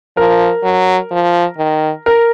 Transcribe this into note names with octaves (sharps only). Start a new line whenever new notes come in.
F3 A#4
F#3
F3
D#3
A#4